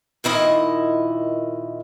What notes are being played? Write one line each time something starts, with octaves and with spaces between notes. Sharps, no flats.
A#2 D#3 E4 D#5